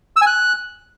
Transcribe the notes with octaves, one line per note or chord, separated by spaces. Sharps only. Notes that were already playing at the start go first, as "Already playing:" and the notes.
E6
G#5
F#6